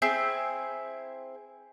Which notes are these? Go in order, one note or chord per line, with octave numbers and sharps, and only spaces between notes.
C4 E4 G#4 G6